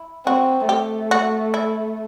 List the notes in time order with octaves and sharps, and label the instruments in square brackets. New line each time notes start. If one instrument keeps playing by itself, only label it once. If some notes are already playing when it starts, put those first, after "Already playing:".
Already playing: [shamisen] E4
[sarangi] C4 [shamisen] F#4
[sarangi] A3 [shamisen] G4
[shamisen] F#4
E4